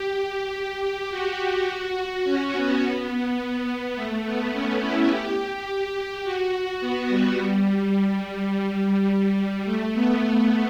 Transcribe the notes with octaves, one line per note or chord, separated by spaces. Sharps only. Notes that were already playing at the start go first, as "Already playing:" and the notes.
Already playing: G4
F#4
C#4
B3
A3
B3
C#4
E4
G4
F#4
B3
G3
G3
A3
B3